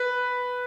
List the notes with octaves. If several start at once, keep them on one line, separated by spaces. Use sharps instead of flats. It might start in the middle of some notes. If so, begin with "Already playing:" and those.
Already playing: B4